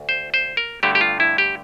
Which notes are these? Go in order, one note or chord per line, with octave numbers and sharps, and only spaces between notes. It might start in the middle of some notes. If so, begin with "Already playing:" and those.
Already playing: D2
C5
C5
A#4
G2 D3 A3 G4
G4
F4
E4
G4